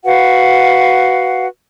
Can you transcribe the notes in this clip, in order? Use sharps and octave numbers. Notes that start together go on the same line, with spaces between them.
F#4 B4 F5 F#5